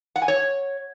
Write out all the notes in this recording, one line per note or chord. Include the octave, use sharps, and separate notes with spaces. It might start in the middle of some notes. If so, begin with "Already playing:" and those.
F#5
G#5
C#5